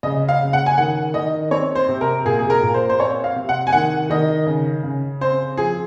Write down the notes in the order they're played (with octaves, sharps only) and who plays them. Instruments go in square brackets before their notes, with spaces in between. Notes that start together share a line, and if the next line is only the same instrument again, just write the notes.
[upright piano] C#3 D#5
F5
C#3
F#5
G#5
D#3 F#5
D#3 D#5
C4 C#5
C5
C3
A#4
A#2 G#4
G#4
A#4
A#2
C5
C5
C4 C#5
F5
C3
F#5
G#5
D#3 F#5
D#3 D#5
C#3
C#3
C4 C5
F3 G#4